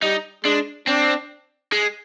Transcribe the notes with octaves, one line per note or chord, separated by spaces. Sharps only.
G3 D#4
G#3 D4
C4 D4
G#3